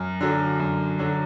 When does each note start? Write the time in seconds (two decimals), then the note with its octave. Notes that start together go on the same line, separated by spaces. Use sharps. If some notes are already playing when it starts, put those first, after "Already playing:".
Already playing: F#2
0.21 D3 F#3
0.60 F#2
0.99 D3 F#3